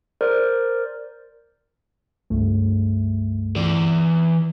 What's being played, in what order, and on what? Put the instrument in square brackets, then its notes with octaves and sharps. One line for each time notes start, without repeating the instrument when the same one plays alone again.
[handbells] A#4 C5 D5
[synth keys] C#2 G2 A3
[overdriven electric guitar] E3 D5